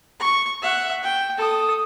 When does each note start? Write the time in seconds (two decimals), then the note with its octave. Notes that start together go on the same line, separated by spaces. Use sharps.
0.19 C#6
0.62 E5 F#5
1.03 G5
1.38 A4 D#6